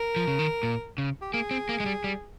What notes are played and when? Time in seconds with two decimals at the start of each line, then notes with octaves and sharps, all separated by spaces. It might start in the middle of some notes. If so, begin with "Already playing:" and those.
Already playing: A#4
0.16 F3
0.27 C#3
0.39 D#3
0.63 A#2
0.98 C#3
1.21 G4
1.33 A#3 G#4
1.51 C4
1.69 A#3
1.80 G#3
1.86 G3
2.04 G3